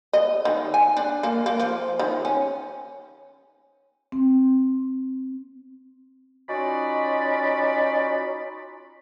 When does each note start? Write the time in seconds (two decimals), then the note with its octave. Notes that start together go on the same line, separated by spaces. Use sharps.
0.13 D#5
0.45 D#3
0.74 G#5
0.97 D4
1.23 A#3
1.46 A#3
1.59 F3
1.99 D#3
2.25 C#4
4.12 C4
6.49 C#4 D#4 F4 F#4 D5 B5